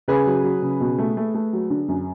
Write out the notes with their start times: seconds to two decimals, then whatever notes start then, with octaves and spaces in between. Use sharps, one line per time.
0.08 C#3 G#4 B4
0.26 F#3
0.44 F#3
0.62 C#3
0.80 B2
0.98 A3
1.17 A3
1.34 A3
1.53 F#3
1.70 D3
1.88 F#2